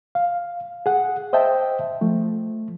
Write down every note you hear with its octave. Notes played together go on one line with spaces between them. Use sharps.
F5
G#4 F#5
C5 D#5 E5 G5 A5
F3 A3